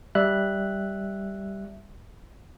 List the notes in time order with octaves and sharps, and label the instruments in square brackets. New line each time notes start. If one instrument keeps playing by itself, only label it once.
[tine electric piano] G3 E5 F#6